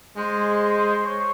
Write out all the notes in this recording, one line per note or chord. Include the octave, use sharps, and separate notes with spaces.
G#3 C5
C#5